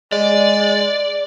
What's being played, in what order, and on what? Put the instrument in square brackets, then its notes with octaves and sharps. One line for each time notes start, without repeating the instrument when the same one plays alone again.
[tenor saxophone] G#3 [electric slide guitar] D5